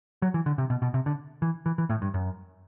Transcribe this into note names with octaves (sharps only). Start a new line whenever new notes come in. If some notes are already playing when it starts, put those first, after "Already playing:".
F#3
E3
D3
C3
B2
B2
C3
D3
E3
E3
E3
A2
G2
F#2